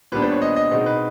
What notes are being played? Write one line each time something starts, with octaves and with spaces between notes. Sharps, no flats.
A#2 G3 B3 D4 B4
C5
C#5
D#5
D#5
B2 G#3 C4 D#4
B4